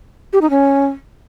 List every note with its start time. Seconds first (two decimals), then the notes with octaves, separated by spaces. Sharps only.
0.33 G4
0.42 D#4
0.50 C#4